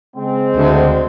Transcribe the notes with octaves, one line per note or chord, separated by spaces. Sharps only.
C#3 G#3 C4
D2